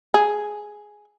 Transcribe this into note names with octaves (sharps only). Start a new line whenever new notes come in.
G#4